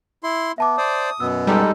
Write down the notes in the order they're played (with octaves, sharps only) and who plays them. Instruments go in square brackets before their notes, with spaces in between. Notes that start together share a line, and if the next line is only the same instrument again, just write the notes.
[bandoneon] E4 C6
[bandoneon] B3 [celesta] E5 A5 D6
[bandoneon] C5 D5 [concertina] D#6
[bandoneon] F#2 B2 B3 [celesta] E6
[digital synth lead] G3 [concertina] G#3 D#4 A4